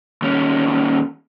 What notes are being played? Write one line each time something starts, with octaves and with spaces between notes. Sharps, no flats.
D#2 C#4